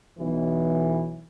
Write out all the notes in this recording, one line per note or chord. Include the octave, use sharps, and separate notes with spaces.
B1 E3